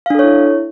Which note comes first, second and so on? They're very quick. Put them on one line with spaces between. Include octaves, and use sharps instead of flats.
F5 D4 A4 C#5 E4